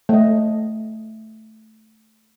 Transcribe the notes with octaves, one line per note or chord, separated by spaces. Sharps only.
A3 D#5